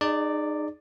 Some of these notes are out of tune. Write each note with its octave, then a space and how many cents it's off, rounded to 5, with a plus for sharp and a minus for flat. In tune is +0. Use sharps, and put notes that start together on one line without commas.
D#4 -30 G#4 +0 D5 +0